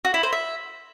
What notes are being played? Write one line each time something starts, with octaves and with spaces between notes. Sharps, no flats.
F#4
E4
C5
E5